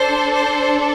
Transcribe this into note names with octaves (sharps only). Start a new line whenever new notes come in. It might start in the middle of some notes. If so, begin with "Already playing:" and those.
Already playing: D4 A4 C5
C5